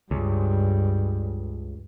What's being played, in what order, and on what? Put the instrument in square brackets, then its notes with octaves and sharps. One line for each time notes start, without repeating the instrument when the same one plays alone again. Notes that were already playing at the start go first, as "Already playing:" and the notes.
[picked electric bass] C#2 [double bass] G2